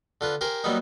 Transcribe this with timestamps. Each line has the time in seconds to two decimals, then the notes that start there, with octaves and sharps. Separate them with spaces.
0.21 D3 F4 B4
0.41 G4 A#4 C5 G#5
0.64 F#3 G3 A#3 B3 D#4